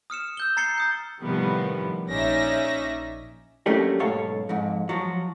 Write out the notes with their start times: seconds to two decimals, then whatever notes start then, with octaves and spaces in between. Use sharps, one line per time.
0.10 D#6 F6 C#7 E7
0.37 E6 G6 G7
0.57 A#5 A6 C7 C#7 G7
0.78 A#5 D#6 G6
1.23 A2 C3 D#3 F3 G3 B3
2.08 A#1 C#4 D#4 D5 E5 A#6
3.66 F#3 A3 A#3 C#4 D4 G4
4.00 B1 G#2 A4 C#5 F5
4.49 F2 G#2
4.89 F3 F#3